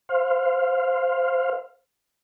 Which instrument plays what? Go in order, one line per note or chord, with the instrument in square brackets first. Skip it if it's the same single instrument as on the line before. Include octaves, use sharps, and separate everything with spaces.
[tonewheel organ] C5 F5